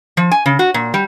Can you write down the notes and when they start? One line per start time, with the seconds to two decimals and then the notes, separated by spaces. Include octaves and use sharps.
0.17 F3
0.31 G#5
0.46 C#3
0.59 F#4
0.74 A#2
0.94 G3